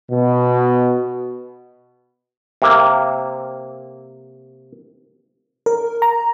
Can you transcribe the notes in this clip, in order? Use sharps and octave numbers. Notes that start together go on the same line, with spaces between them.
B2
C3 A#3
A#4
A#5